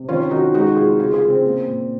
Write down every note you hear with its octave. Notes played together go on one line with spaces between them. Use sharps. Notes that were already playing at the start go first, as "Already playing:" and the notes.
Already playing: C3
D#3 C#4 F4
D#3 D#4 F#4
G#3 D#4 F#4
C3 F4 G#4
C#3 F4 G#4
F4 G#4
C#3
C4
A#3
A#2